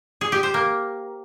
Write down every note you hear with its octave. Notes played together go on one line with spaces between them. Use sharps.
G#4
G4
C5
A#3